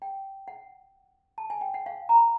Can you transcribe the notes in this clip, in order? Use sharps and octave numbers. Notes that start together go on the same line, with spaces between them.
G5
F#5
A5
G#5
G5
F#5
F5
A#5
B5